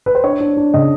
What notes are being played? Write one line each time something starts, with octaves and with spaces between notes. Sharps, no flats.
B4
C5
D4 C#5
D4
D4
C#3 D#5